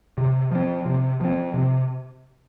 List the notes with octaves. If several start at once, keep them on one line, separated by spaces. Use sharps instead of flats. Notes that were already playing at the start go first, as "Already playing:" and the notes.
C3
F3 C4
C3
F3 C4
C3